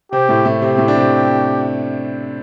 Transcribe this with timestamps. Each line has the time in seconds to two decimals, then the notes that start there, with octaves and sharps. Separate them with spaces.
0.12 C3 C4 G4
0.29 A2 A3
0.45 A2 A3
0.62 C3 C4 G4
0.78 A2 A3
0.88 D4
0.95 C3 C4